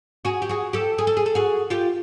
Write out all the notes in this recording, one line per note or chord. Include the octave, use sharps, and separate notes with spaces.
F#4 G#4
G4
F#4 G#4
G4 A4
G#4
A4
G#4
A4
F#4 G#4
F4 G4